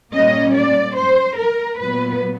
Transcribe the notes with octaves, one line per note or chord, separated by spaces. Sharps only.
A#2 G3 A#3 C#4 D#5
D5
C5
A#4
A#2 F#3 B3 B4